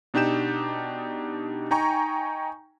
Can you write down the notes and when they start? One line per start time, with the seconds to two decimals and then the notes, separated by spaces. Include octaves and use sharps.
0.14 B2 D4 D#4 G4 G6 E7
1.71 D#4 G5 G#5 A#5 C#6